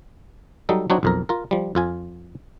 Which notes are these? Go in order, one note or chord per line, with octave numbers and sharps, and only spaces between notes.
F#3 G3 D#4 A4
F#3 C4 D4 D#4 F#4 C#5
B1 F2 A#4
F4 A#4
F3 G3
F2 F4 G#5